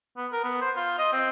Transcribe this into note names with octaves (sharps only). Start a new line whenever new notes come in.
B3
A#4
B3
C5
F4
D#5
C4